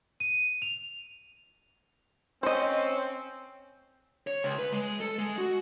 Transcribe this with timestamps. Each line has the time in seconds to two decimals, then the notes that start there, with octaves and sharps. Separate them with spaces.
0.20 D#7
0.62 F7
2.43 C4 C#4 C5 D#5
4.27 C#5
4.44 C#2
4.59 B4
4.72 G#3
5.00 A4
5.18 G#3
5.38 F#4